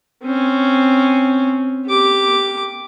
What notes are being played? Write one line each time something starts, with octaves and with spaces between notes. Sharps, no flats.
C4 C#4
G4 D6